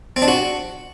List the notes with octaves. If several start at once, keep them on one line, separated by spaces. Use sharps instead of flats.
C4
D4
F#4